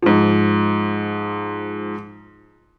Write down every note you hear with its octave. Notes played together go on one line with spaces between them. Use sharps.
G#2 F3